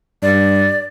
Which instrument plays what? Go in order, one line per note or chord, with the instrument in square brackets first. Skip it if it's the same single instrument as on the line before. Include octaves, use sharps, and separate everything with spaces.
[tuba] G2 [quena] D5